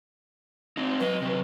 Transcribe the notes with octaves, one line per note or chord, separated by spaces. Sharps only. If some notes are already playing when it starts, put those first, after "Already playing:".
C4 D#4
F#3 B4 D#5
C3 F#3